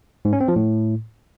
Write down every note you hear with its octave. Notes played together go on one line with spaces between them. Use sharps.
G#2
C#4
C4
F3
A2